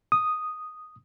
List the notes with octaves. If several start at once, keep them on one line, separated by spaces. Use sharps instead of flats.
D#6